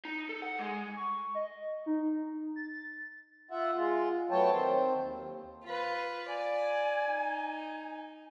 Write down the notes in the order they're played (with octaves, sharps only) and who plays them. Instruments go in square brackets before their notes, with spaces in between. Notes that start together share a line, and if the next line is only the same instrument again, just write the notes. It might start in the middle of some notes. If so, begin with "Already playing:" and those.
[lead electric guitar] D#4
A4
F#5
G#3
[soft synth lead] C#6
D#5
D#4
A6
[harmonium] F4 E5 F#5
G#3 F4
F#3 A3 B3 C#5 G5 A5
D#3 C4 C5
D#2
[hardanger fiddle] F4 B4
[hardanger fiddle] D5 [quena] G#5
[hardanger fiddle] D#4